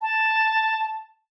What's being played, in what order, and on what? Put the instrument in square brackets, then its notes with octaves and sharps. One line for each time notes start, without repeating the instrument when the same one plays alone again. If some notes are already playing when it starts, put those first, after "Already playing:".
[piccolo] A5